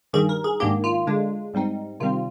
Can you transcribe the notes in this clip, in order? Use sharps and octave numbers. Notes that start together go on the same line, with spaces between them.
G2 D#3 G3 G#4
A#4
G#4
G#2 D#3 A#3 D4 G4
F4
D3 G#3 D4
G#2 G3 C4 D#4
C3 D#3 G3 C4 F4